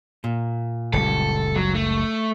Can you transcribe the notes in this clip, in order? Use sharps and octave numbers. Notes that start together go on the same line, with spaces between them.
A#2
F#1 C#2 G3 A4
F#3
A3